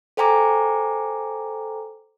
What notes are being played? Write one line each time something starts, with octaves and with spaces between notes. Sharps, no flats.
A4 C5 G5 G#5 A#5 D6